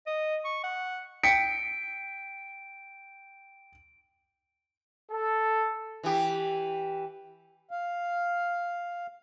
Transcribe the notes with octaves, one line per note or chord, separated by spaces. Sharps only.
D#5
C#6
F#5
G5 B6 C#7 D7
A4
E3 G4
F5